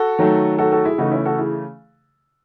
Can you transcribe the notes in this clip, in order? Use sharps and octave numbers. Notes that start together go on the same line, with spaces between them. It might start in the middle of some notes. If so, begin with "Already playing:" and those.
Already playing: F#4 A4
D#3 F#3 A3
F#4 A4
F#4 A4
E4 G#4
C#3 E3 A3 D#4 F#4
C#4 E4
F#4 A4
E4 G#4